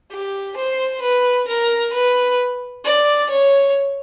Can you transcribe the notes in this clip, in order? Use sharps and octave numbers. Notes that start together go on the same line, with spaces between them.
G4
C5
B4
A#4
B4
D5
C#5